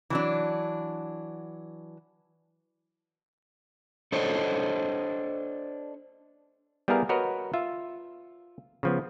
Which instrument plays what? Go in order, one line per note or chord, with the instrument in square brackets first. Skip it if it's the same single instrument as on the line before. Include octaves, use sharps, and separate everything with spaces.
[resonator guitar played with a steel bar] E3 F#3 D4
[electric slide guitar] D4 A4 C5 C#5 D#5
[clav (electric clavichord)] G3 B3 E4 G#4 A#4 F5
F#4 A#4 B4 C#5 D#5
F4 E5
C#3 F3 B3